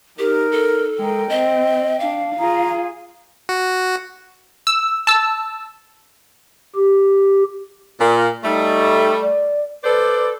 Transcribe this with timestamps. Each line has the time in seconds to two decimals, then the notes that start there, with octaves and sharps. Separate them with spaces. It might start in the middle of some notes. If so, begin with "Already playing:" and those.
0.19 D#4 G4 A#4
0.51 A4
0.99 G#3 A#4 G5
1.29 C4 D#5
2.00 D4 F5
2.39 F4 G#4 A#5
3.49 F#4
4.67 E6
5.07 A5 E6
6.76 G4
7.99 A#2
8.44 G3 A3 D#4
9.22 D5
9.83 A4 B4 C5 D5